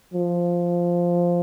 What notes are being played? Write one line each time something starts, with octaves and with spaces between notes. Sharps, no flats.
F3